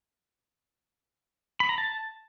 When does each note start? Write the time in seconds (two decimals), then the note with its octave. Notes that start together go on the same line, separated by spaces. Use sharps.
1.60 B5
1.69 A#5
1.78 A5